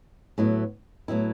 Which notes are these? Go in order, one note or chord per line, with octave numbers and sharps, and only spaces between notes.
A2 F#3 B3 E4
A2 F#3 B3 E4